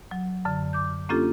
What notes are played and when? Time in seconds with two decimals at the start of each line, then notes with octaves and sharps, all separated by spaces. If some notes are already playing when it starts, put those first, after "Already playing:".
0.11 F#3
0.45 F#2 D3
0.73 D6 G6
1.09 A#3 C#4 D4 F4 G4 A4